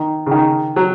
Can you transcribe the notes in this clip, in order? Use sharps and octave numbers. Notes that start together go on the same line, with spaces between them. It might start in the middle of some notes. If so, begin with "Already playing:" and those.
Already playing: D#3
C#3
D#3
F#3